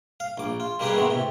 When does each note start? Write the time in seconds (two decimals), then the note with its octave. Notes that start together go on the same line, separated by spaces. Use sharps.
0.20 F5
0.38 A#1 D6
0.60 F4
0.79 G3 A#3 D#4 G4 G#4 B4
0.95 B2 D#3 G#3 A3 B3
1.07 A2 C3